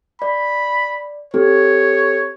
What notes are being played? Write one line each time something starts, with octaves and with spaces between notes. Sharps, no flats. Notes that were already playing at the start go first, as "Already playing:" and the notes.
D5 B5
C4 G4 A4 C#5